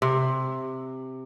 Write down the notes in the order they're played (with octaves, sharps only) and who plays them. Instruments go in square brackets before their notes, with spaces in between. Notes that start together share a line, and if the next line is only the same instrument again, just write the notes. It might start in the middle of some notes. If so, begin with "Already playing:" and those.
[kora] C3